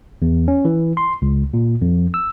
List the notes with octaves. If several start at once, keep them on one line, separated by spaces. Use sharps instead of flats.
E2
C#4
E3
C6
C#2
A#2
F2
E6